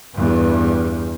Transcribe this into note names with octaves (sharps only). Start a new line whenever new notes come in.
E2 G2